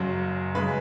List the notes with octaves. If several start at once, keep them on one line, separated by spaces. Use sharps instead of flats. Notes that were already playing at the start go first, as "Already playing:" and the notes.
Already playing: F#1 F#2 F#3
F#2 C#3 G#3 B4